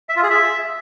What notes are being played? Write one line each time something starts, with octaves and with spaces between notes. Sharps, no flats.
E5
F4
G#4
E5